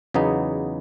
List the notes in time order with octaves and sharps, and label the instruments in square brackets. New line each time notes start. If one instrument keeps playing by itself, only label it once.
[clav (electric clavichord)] E2 C#3 F#3 B3 D#4